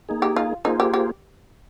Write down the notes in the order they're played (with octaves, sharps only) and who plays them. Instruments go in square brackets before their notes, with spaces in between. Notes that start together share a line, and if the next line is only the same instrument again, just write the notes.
[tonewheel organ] A#3 D#4 G#4
[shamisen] G4
F4
[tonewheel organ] A#3 F4 G#4 C5 [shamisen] D#4
[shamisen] G4
G4